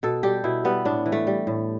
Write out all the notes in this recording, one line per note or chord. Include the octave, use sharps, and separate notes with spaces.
B2 A4
G3 G4
B2 E4
G3 B3
A2 D4
E3
A3
G3
A2